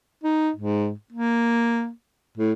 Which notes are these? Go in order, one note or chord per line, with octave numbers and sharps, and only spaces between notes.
D#4
G#2
A#3
A2